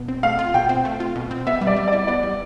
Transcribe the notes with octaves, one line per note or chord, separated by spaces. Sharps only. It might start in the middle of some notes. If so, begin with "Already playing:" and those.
Already playing: B2
C4
A3 F5
F4
B2 G5
C4
A3
F4
B2
C4
B3 E5
G3
D5
G3
D5
E4
B3 D5
G3